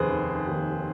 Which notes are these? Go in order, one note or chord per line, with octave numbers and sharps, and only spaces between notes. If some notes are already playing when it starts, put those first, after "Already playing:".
Already playing: F1 D#2 G#4 B4 C5
F1
D#2